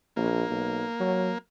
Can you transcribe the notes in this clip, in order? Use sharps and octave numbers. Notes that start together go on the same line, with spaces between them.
A#1 A#3
B1
F#3